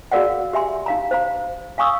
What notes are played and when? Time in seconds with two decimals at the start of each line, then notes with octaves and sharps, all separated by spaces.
0.12 F#4 G#4 A#4 D5 F5 F#5
0.53 G4 E5 G#5 C6
0.86 D#4 F5 A#5
1.11 C5 F5 A#5
1.78 F5 G#5 C#6 D#6 E6